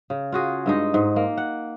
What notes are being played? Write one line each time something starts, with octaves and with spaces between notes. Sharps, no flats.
C#3
F4 F#4 G#4
G2 G#3 D#4
G#2
A#3
F#5